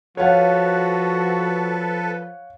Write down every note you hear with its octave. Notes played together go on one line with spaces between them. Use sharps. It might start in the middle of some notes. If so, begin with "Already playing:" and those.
F3 F#4 A4 B4 C#5 F5 F#5